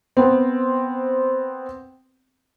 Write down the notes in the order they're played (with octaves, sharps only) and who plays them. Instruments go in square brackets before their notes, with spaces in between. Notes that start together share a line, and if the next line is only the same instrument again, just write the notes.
[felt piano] B3 C4